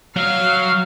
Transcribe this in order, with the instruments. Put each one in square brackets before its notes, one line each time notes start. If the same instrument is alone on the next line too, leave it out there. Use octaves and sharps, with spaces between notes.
[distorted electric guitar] F#3 [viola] F5